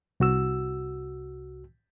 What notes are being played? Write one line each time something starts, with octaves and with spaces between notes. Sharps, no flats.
C2 F#4 E6